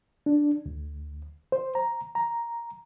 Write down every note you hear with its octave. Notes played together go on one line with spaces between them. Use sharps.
D4
D2
C5
A#5
A#5